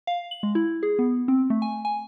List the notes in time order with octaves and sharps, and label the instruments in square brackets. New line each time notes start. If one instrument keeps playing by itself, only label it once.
[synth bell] F5
F#7
G#3
E4
G#4
B3
C4
A3
G#5
G#5